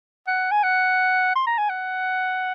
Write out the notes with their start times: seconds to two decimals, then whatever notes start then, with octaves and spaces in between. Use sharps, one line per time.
0.27 F#5
0.51 G#5
0.63 F#5
1.36 C6
1.47 A#5
1.58 G#5
1.70 F#5